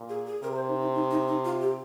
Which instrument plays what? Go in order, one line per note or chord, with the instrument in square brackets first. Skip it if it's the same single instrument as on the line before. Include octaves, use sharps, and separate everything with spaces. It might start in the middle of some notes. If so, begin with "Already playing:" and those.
Already playing: [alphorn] A#2
[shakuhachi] G#4
G#4
[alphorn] C3 [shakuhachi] A#4
[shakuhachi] C5
D#4
D#4
D#4
D#4
D#4
F4
G4